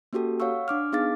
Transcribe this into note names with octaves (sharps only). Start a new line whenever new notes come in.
A#3 C#4 F#4 G4 A4
C#5 F5 F#5 C#6 E6
D4 D6 F6
B3 D#4 G#4 F5 D6 A6